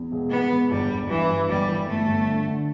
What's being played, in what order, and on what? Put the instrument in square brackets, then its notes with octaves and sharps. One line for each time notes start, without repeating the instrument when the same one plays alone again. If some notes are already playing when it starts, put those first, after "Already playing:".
Already playing: [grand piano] E2
E1
[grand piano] E2 [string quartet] B3
[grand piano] E1
[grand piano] G1 [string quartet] G3
[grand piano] G1
[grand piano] G2 [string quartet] E3
[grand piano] G2
[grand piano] G1 [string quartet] G3
[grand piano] E3
[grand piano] G1 [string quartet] A3
[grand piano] G1
D3
D3